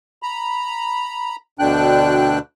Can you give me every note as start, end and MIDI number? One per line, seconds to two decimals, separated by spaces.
0.23 1.36 82
0.23 1.36 83
1.59 2.39 38
1.59 2.39 47
1.59 2.39 50
1.59 2.39 62
1.59 2.39 79
1.59 2.39 90